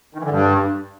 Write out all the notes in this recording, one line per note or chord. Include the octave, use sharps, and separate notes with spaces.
D#3
E3
D3
G2